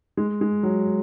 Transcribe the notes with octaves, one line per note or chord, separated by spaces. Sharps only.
G#3
G#3
F#3